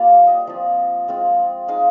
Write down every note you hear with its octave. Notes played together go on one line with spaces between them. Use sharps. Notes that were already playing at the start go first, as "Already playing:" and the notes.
Already playing: G3 A#3 F4 C5 D5 F5
D#5 G5
F3 C4 F4
G#3 C4 F4
G#3 D#4 F5 G#5